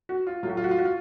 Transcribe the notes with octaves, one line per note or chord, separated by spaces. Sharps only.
F#4
F4
A2 F#3 A3 F4
F#4
F4
F#4
F4
F#4
F4